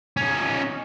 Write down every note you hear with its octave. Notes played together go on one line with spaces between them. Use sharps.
C#4 D#4